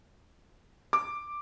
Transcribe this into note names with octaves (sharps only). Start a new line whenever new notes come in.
D6